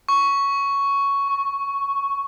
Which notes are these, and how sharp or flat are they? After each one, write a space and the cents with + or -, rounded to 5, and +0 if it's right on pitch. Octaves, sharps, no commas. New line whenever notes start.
C#6 +5
C#6 -15